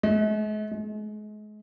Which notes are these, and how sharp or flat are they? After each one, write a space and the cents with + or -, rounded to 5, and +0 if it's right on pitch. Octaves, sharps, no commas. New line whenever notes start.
G#3 +45
G#3 +35